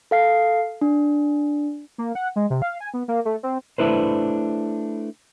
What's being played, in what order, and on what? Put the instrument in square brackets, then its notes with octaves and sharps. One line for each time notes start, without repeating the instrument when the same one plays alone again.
[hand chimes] A4 F5 C7
D4
[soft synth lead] A#3
F#5
G#3
C3
F5
G#5
B3
A#3
A3
C4
[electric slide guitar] A3 D4 E4 B4 C5